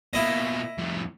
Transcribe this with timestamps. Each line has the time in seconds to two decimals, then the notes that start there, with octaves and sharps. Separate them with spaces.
0.13 B2 A#3 E4 D#5
0.78 F2 A2